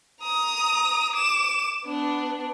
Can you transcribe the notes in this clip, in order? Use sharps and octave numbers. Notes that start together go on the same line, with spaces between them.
A#5 D#6
D6 E7
B3 D4